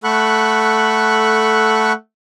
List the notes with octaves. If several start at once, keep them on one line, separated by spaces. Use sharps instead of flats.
A3 A4 F#5 B5 C#6 F#6